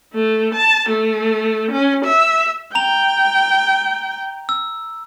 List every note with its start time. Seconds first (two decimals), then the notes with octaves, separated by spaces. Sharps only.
0.14 A3
0.54 A5
0.89 A3
1.71 C#4
2.05 E5
2.75 G5 A#5 F7
4.49 E6